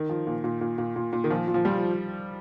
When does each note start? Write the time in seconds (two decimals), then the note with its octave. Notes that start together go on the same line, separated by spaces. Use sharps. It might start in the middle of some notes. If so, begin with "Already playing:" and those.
Already playing: D#3
0.09 F3
0.27 A#2
0.44 A#2
0.61 A#2
0.78 A#2
0.96 A#2
1.13 A#2
1.24 D#3
1.30 A#2 F3
1.48 A#2
1.54 F3
1.65 F3 G3